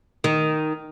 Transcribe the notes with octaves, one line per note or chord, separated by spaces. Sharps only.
D#3